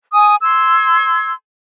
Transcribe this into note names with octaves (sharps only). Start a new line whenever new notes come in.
G#5 D#6
C6 E6 G#6